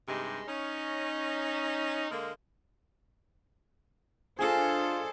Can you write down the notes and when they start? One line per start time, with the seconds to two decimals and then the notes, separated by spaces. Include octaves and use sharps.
0.08 G2 C3 G#3 D#4
0.48 C#4 D#4
2.11 D3 G#3 A#3
4.39 D4 F4 G#4 A4 C5 D#5